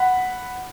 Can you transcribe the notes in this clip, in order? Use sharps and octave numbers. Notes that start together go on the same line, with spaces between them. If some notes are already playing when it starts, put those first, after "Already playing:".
Already playing: F#5 B5